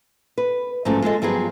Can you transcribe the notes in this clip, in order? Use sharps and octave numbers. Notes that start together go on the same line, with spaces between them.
B4
G#2 F3 F#3 A3 C#4
G#3 F4 A4 D#5
G2 F3 F#3 B3 F4 G#4